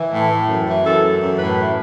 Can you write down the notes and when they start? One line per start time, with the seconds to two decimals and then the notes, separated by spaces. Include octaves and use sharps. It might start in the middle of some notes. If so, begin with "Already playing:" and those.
Already playing: E3
0.11 A2
0.29 E3
0.48 F#2
0.66 E3
0.84 F#2 A4
1.02 E3
1.21 F#2
1.39 A2 B4
1.58 E3